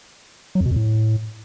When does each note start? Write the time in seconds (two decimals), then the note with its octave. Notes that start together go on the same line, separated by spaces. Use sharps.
0.55 F#3
0.60 F2
0.66 B2
0.71 F2
0.76 A2